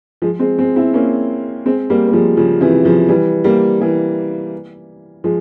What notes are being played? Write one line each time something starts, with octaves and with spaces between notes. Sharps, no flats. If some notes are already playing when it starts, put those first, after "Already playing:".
F3 G#3
G#3 C4
G#3 C4
C4 E4
A#3 C#4
G#3 C4
G3 A#3
A#3
F3 G#3
C#3 F3
C3 E3
C#3 F3
E3 G3
G3 A#3
E3 G3
F3 G#3